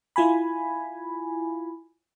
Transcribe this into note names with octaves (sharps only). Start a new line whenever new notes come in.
E4 F4 G#5 B5